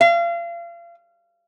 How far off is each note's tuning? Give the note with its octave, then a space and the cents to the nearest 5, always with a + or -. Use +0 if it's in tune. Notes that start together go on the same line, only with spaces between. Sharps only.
F5 -35